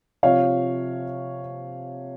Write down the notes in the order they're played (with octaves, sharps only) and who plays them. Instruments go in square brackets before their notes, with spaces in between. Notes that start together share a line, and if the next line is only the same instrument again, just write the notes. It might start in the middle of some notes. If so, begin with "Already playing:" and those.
[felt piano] C3 F3 C#5 F5